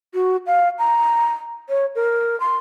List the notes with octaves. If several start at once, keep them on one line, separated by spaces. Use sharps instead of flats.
F#4
F5
A#5
C#5
A#4
C6